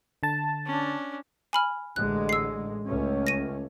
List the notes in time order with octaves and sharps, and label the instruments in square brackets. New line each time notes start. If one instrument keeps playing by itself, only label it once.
[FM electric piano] D3 A5
[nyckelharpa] C#4 D4
[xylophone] G#5 B5 F6
[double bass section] A1 D3 G#3 [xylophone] F#6
[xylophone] E6 C7
[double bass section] C#2 A3 C#4
[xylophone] A#6 D#7